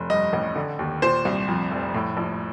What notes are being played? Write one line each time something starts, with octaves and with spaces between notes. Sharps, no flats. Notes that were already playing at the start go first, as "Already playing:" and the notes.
Already playing: F1
G2 D#5
A1
D3
D#2
A#2 C5
C2
F2
F1
A2
A#1